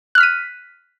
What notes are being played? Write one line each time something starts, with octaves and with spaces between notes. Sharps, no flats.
F6 F#6 B6 D#7